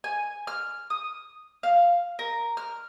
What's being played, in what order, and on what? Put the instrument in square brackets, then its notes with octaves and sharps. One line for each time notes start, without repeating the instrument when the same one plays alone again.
[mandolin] G#5
F6
D#6
F5
A#4
F6